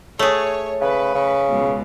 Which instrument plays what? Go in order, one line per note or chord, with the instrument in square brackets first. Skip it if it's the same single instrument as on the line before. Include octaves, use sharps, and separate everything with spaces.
[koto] A3 G#4 [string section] C#5
[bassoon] C#3 [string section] B4
[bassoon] C#3
[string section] C#2 B2